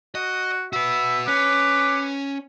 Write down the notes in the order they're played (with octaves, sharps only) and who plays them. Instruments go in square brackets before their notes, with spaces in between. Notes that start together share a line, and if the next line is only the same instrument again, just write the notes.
[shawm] F#4 [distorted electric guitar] D#5
[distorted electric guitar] F#4 B4 [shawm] E5
[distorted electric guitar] C#4 [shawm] B4 [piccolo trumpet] D6